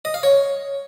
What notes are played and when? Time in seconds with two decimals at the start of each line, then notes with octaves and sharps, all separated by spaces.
0.05 D#5
0.14 F5
0.23 C#5